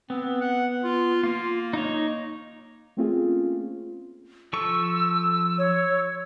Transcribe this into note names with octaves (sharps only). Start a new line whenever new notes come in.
B3 C4
F#5
F4
A#3 F4
D#4 C#5
A3 A#3 C4 C#4 F4 G#4
F3 A4 C#6 E6
C#5